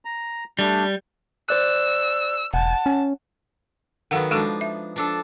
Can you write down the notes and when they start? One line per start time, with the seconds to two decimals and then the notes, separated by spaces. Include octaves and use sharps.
0.05 A#5
0.59 G3 A3 D4
1.49 C5 D5 E6 F#6
2.54 E1 F#5 A5
2.86 C#4
4.11 D#3 F#3 B3 A4 F5 F#5
4.31 F3 G#3 D4 D#4 F#4 A4
4.61 E5
4.96 F3 D4 A4